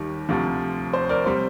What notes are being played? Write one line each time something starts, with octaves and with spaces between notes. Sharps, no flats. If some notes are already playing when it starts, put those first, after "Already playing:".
Already playing: D#2 D#3 G3
D2 C3 F3
C5
A#4 D5
C3 G3 C5